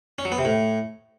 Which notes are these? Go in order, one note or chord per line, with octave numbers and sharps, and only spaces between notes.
C#4
F#3
B3
C3
A2